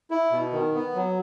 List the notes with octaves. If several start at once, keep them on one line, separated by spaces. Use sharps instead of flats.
E4
B2
D#3
B3
F#3